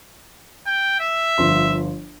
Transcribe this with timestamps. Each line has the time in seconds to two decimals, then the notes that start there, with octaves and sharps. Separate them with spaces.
0.66 G5
1.00 E5
1.38 G1 F3 C6